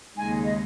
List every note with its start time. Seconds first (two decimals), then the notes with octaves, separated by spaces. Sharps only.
0.17 D#2 C#3 G#3 D#4 G#5
0.45 D#5